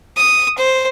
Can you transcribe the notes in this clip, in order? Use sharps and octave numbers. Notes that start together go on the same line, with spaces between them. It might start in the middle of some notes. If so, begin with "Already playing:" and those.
D#6
C5